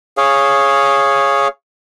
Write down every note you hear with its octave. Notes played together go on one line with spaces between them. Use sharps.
G#4 C#5 F5